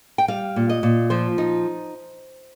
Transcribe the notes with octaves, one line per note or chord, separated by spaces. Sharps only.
G5
G3 F5
A#2
D#5
A#2
F3 C5
D#4